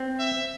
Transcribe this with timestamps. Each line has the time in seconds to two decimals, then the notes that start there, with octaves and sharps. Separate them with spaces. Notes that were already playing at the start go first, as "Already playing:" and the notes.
Already playing: C4
0.19 E5